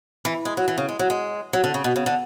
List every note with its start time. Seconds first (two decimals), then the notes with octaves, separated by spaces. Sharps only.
0.25 E3
0.45 G#3
0.57 F#3
0.68 E3
0.78 C#3
0.89 G#3
0.99 F#3
1.10 G#3
1.53 F#3
1.64 D3
1.74 C#3
1.84 B2
1.96 C#3
2.06 D3